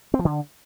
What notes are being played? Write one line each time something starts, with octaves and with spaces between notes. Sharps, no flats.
C4
F3
D3